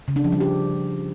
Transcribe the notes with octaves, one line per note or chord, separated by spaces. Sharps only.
C#3
D4
F3
G3
G4